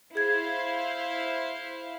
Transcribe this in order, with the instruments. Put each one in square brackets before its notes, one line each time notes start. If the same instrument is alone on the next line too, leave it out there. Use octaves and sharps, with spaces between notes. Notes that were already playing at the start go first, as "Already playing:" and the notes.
[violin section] E4 C5 F5 [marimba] G#4 G#6